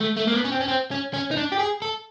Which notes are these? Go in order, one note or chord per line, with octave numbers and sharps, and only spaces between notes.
A3
A3
A#3
B3
C#4
C4
C#4
C4
C#4
C#4
D#4
D4
G4
G#4
A4